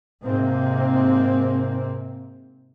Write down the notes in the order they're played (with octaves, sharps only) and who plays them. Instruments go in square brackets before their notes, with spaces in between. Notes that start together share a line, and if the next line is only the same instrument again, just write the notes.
[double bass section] G#2 C3 A#3 C4